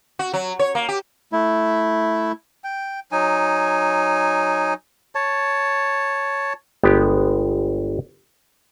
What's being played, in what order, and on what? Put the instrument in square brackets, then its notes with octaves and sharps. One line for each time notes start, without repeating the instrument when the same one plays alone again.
[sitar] F#4
F#3
C#5
A#3
G4
[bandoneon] A3 E4
[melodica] G5
F#3 D#4 G#5
C#5 A5
[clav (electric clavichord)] G1 G#3 B3 G4